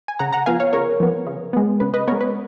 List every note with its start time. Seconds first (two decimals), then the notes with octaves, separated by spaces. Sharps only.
0.08 G#5
0.19 C#3 F#5 A#5
0.33 F#5 A#5
0.46 F3 B3 F5 G#5
0.60 C#5 F5
0.73 C#3 A#4 C#5
1.00 F3 B3
1.27 C#3
1.53 G#3 B3
1.80 C#3 B4
1.94 B4 D#5
2.07 G#3 B3 A#4 C#5
2.21 B4